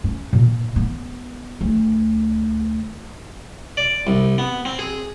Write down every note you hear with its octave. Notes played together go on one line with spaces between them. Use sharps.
C#4
A#2
B3
D2
D5
C2
B3
C4
G#4